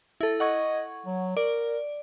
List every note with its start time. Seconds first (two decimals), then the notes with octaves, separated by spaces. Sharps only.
0.21 E4 A4
0.40 D#5 F#5 C#6 G#6
1.06 F#3
1.37 A#4 D5